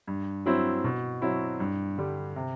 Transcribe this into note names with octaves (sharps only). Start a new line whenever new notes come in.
G2
F#3 C4 E4
B2
F#3 C4 E4
G2
D3 G3
C3